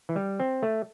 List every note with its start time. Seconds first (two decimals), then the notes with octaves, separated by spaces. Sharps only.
0.09 E3
0.16 G3
0.40 C4
0.63 A3